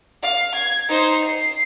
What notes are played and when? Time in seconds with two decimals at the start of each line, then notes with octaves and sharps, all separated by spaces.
0.23 F5
0.55 G#6
0.89 D#4 C5
1.24 C7